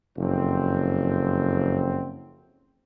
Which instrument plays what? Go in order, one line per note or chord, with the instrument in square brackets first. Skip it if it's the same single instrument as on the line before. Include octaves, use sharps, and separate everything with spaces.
[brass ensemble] F#1 F2 C4